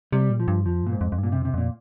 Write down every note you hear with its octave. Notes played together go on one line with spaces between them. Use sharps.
C3 G3
A#2
F3
G2
F2 F3
G2 A#2
G#2
F2
F2
G2
A#2
C3
F2
C3
F2 A#2